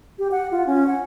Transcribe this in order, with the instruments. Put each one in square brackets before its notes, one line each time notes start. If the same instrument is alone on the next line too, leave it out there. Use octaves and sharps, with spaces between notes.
[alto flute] G4
F#5
F4
C#4
F#5